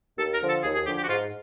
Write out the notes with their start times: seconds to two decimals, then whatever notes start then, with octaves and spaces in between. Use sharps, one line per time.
0.18 D#2 A4
0.34 A#4
0.41 D3 F3
0.49 A4
0.63 D#2 G#4
0.74 G#4
0.86 D3 F3 G4
0.97 G4
1.03 F#4
1.08 G#2 F4